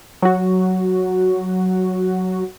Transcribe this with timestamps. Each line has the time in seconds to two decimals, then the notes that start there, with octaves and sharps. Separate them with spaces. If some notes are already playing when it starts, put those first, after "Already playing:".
0.22 F#3 F#4